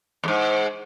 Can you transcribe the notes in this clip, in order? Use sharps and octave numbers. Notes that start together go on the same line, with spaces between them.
E2 G#2